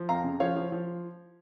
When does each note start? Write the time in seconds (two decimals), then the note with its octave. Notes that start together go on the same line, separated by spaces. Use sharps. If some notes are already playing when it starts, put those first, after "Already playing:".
Already playing: F3
0.09 F2 F5 A#5
0.24 C#3
0.40 F3 C#5 F5
0.56 F3
0.72 F3